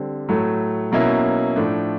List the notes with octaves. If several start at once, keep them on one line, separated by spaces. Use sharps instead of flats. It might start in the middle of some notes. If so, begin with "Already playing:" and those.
Already playing: D3 G3 C4
A2 F#3 A3
B2 F#3 A#3 C#4 E4
A2 F3 A3 D4